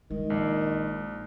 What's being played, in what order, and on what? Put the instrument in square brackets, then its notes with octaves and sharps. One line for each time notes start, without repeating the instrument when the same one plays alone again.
[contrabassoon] D#3 [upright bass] G#3
[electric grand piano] A#1